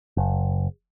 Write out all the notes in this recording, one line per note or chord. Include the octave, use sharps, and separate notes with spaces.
F#1